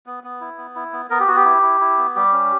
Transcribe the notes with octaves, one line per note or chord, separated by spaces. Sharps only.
B3
B3
E4
B3
E4
B3
B3 A#4
G4
B3 F#4
G4
E4
E4
E4
B3
G3 G4
C#4